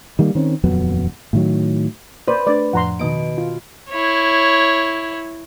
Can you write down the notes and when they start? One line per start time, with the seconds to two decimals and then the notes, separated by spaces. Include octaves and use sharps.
0.19 D#3 G3 A#3
0.35 D#3 C4 C#4
0.64 D#1 F2 F#3 B3
1.33 A2 D#3 F#3
2.28 B4 C5 D5
2.47 A3 D4 D5
2.73 F2 A2 F3 F#5 A#5 C6
2.99 B2 D#3 D#5 D7
3.38 F4
3.90 E4 C#5